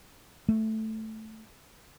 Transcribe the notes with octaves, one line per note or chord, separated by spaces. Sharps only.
A3